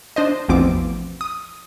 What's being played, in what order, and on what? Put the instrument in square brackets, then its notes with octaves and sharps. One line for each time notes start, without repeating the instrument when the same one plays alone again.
[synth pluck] D4 C5 D#5
A1 E2 B2 F3 C4 D6
D#6